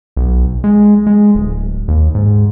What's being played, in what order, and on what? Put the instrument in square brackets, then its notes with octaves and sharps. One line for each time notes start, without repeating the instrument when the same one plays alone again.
[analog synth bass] B1
G#3
G#3
D1
D#2
G#2